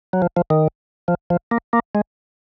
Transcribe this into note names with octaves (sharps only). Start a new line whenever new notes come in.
F#3
F3
F3
D#3
F3
F3
A#3
A#3
G#3